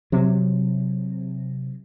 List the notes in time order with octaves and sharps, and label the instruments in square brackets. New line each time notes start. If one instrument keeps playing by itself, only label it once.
[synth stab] C3 [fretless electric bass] F#3